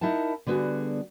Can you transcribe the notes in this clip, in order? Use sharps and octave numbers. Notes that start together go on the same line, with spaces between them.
D#4 E4 A#4 F#5 A5
D3 G3 B3 F#4 G#4